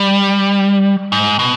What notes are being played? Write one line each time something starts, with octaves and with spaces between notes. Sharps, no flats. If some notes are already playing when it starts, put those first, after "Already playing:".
Already playing: G3
G#2
B2